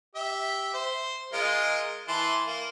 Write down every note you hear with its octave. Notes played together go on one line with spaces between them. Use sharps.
G4 E5
C5
G#3 F4 A#4
E3 A5 C6
A#3